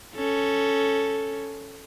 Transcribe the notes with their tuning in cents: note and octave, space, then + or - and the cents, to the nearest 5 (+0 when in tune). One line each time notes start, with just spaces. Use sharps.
C#4 +0 A4 +0